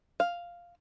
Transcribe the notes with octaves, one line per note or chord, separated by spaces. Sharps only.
F5